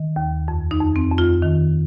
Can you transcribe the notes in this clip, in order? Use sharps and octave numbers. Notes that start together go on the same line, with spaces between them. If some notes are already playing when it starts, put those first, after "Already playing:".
Already playing: D#3
D#2
F2
D#4
F2
C4
F2
F4
D#3